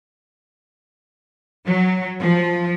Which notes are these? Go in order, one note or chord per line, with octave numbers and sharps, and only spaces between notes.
F#3
F3